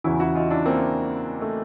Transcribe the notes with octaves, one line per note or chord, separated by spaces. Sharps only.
E2 C#3 E3 E4 F#4
E4 F#4
D#4 F4
D4 E4
A#3 C4
A3